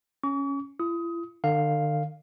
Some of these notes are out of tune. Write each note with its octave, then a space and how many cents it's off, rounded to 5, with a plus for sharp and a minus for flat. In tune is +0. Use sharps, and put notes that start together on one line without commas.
C#4 +0 C#6 +45
E4 +45 D#6 +20
D3 +45 F5 +0